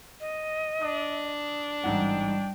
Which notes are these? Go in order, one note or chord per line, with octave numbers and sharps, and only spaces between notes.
D#5
D4 D#6
A1 G#2 G3 F#5 G5